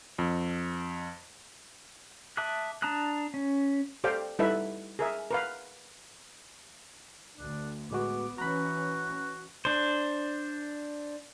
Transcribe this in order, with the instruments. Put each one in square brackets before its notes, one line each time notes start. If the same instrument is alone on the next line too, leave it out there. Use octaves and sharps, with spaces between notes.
[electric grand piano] F2
[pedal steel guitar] E5 A5 D6 D#6 F#6
D4 A5 A#5 D#6 F#6
C#4
[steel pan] G4 A4 C5 D5 F5 G5
G3 D#4 E4 A4 B4 E5
G#4 A#4 E5
A#4 B4 F5
[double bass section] D2 [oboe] D4
[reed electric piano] A2 G#3 F#4 [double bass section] B3 [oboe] D6
[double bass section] E3 C#4 [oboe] F#4 [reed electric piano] A#5 B5
[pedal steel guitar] D4 C5